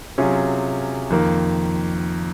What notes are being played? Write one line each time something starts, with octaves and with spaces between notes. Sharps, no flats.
C3 F#3 C#4 F4 G#4
F2 D#3 A#3